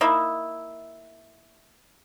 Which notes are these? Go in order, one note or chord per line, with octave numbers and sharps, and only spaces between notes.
A#3 D#4 E4